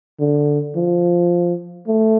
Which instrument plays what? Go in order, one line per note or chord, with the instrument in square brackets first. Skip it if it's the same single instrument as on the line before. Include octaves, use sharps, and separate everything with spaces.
[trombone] D3
F3
A3